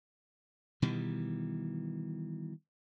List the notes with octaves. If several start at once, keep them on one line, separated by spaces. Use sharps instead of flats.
B2 D#3 E3 G3